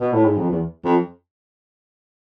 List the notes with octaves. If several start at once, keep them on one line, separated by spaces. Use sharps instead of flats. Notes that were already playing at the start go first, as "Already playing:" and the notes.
B2
A2
G#2
F2
E2
F2